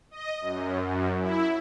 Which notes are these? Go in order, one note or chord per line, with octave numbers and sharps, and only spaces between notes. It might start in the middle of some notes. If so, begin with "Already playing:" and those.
D#5
F#2
F#2
E4